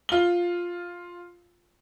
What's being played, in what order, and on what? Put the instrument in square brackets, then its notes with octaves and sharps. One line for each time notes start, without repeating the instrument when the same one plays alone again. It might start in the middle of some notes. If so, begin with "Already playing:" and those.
[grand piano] F4 G7